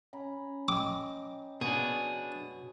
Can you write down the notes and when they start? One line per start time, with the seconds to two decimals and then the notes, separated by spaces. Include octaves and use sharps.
0.13 C#4 A#5 B5
0.68 D#5 G5 D6
1.61 B2 D4 G#4